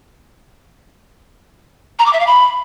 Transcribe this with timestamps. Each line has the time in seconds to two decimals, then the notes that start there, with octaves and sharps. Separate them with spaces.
1.99 A#5
2.06 D6
2.13 E5
2.20 F5
2.27 B5